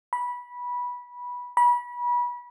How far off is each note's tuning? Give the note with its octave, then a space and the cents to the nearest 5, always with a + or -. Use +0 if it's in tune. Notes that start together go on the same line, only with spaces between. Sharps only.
B5 -15
B5 -30